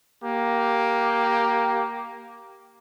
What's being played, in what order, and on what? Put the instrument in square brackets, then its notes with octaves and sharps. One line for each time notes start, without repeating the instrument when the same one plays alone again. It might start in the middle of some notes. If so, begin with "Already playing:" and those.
[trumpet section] A#3 G4